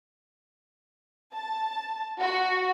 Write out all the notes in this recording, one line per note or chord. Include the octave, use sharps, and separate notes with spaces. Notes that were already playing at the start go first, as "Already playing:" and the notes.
A5
F#4